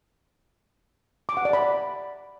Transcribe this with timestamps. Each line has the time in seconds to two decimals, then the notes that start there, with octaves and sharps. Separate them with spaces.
1.29 D6
1.37 F#5
1.45 D5
1.53 B5